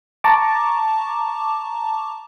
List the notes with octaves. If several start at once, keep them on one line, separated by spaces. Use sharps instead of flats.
A5 A#5 C#6 D6